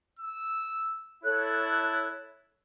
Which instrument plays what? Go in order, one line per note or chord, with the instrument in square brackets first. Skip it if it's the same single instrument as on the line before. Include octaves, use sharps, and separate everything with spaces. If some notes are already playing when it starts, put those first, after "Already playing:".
[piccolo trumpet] E6
[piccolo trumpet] E4 [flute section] A4 C#5 F#6